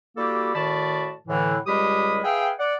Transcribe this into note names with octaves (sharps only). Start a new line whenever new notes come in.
G3 A#3 E4 F#4 G4 A4
A2 D#3 F#4 D5 A5 B5
A2 D3 E3
C#2 G3 G#3 G4 B5 D#6
G#4 B4 E5 F5 G5
D5 F#5